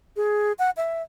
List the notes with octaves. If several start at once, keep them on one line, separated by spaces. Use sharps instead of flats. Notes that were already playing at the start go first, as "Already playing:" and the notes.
G#4
F#5
E5